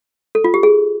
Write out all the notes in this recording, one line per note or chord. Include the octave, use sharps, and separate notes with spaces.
A4
F4
G4
G#4